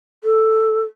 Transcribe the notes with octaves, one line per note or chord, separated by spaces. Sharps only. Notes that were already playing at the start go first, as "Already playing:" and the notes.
A4